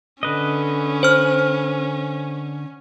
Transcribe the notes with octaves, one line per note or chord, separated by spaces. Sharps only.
D3 C#4 B4 D#5
C5 F6